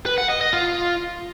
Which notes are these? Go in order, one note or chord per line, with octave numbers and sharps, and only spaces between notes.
B4
F#5
D#5
D#5
F4